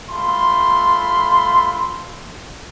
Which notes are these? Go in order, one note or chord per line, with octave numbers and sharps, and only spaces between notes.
G3 A3 F4 B5 C6